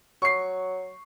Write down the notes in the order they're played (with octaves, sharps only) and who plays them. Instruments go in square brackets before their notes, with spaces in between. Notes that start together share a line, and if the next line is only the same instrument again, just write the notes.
[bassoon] F#3 [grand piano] C#6 C7